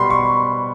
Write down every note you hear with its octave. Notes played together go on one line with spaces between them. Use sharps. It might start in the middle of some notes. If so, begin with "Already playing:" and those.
Already playing: B2 G3 B5 C6
C#6